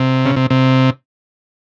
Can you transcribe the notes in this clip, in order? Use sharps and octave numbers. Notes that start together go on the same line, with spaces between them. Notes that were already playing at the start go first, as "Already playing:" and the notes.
Already playing: C3
C#3
C3
C3